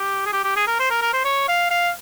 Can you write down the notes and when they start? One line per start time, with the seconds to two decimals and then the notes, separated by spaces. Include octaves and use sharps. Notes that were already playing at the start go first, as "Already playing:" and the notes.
Already playing: G4
0.26 G#4
0.33 G4
0.44 G4
0.56 G#4
0.67 A#4
0.79 C5
0.90 A#4
1.02 A#4
1.13 C5
1.25 C#5
1.48 F5
1.71 F5